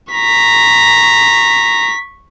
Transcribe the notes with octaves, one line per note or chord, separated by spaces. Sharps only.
A#5 C#6 B6